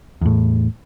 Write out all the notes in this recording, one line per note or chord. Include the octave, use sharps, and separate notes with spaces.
E2 A2